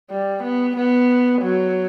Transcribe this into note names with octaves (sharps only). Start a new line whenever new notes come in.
G3
B3
B3
F#3